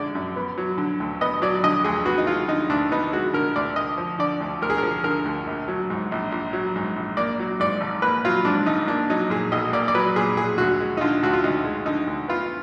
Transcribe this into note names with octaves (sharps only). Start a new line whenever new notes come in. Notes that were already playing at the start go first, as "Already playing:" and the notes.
Already playing: F#2 D3 G#3 D5
F#2
B3
F#3
D3
D2
B3 D#5
F#3 D5
D3 D#5
D2 G#4
B3 F#4
D#4
G#3 F4
D3 D#4
D2 D4
B3 D#4
G#3 F#4
D3 A#4
D2 D5
D2 D#5
F3
D3 D5
D2
D2 A#4
G#4
F3 A#4
D3 A#4
D2
A#1
F#3
G#2
A#1
A#1
F#3
G#2
A#1
A#3 D5
F#3
G#2 D5
G#1
A#3 B4
F#3 F4
G#2 D4
G#1 D#4
A#3 D4
F#3 D#4
A#2 G#4
B1 D#5
A#3 D5
D5
F#3 B4
A#2 G#4
B1 G#4
D2 F#4
G#3
D#4
D3 F4
D2 F#4
F4
D2 D#4
G#3
D3 D#4
D2
B3 F4